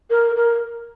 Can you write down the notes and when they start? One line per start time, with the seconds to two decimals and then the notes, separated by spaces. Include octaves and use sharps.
0.10 A#4
0.35 A#4